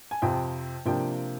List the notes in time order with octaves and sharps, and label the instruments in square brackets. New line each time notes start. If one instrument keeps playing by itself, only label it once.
[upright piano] G#5
F2 C3 F3 G5
C3 F3 A#3 D4 G5